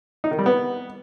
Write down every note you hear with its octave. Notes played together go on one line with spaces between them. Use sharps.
D#4
D#3
G3
B3